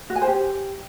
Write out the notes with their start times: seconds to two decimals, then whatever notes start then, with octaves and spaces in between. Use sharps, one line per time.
0.10 F#4
0.16 G#5
0.22 C5
0.28 G4